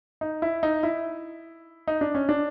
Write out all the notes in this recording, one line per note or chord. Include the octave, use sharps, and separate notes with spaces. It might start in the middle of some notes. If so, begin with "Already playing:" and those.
D#4
E4
D#4
E4
D#4
D4
C#4
D4